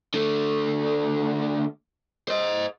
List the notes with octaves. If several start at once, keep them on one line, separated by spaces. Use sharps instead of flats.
D3 A3
C5 D#5